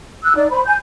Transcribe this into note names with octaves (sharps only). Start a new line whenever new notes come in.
E6 F#6
D#4 D5
C5 B5
G#5 G6